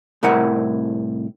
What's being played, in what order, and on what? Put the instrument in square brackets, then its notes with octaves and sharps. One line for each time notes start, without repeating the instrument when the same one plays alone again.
[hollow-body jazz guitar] C2 A2 E4 A#4 F#5